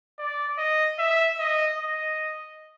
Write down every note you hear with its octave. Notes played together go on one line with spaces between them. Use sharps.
D5
D#5
E5
D#5
D#5